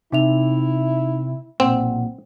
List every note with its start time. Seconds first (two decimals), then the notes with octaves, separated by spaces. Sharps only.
0.12 C3 D#4 E4 E5 F7
1.60 B1 A#2 C4 F#5